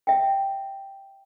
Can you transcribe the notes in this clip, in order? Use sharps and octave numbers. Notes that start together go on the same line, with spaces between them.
E5 G5